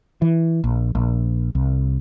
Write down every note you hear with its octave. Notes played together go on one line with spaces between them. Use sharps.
E3
A#1
A#1
C2